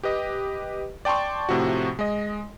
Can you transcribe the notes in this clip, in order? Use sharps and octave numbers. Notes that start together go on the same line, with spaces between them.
G4 B4 D#5
D5 G5 A5 C6 C#6
A2 C3 F3 F#4
G#3 D#5